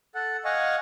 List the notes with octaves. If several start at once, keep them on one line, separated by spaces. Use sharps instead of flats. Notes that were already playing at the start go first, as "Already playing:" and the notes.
A4 F#5
D#5 F5 F#5 G#5 C#6